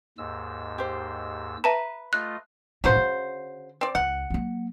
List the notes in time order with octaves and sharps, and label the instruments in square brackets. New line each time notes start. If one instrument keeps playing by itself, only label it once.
[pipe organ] D#2 G#2 E6
[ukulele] G4 C5
[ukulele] B4 [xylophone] E5 A5 A#5
[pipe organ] A3 F4 D#5 [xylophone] F#6
[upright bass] A2 C#4 [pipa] C#3 F#4 C5
[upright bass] D3
[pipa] C4 D5
[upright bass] C#2 [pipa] F#5
[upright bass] F#3 A#3